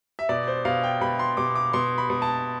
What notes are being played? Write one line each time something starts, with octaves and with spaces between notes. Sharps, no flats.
E5
B2 D5
C5
B2 F5
G5
B2 B5
C6
B2 D6
D6
B2 C6
B5
B2
A5